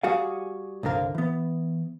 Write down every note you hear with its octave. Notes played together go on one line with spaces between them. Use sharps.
G3 F#4 G#4 F5
C2 G2 D3 A#4 F5
E3 B3